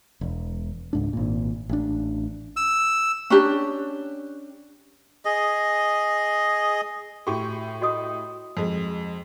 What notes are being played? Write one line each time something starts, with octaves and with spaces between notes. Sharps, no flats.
E1
C#2 G#2 D4
G#1 A#2
A1 D4
E6
C#4 D4 G4
G#4 D#5
A2 F#4 G4 C#6 D6
F#4 D#5 D#6
F2 G#3